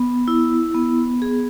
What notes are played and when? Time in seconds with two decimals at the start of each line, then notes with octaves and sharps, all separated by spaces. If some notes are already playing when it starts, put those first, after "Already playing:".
Already playing: B3
0.28 E4
0.75 B3
1.22 G#4